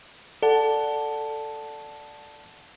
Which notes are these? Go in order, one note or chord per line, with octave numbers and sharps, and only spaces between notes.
A4 D5 F#5 A5